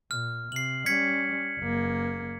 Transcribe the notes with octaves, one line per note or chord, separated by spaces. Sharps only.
A#2 F6
C3 C7 F#7
G3 C#4 G#6 B6 C#7
F#1 A#3